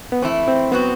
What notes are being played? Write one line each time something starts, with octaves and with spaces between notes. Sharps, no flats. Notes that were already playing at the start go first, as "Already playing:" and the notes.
B3
E3 A3 C4 E4
C4
F#3 B3 C4 F#4